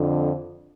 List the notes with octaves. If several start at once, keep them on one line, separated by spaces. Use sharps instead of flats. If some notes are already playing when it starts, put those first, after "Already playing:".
Already playing: F2 D3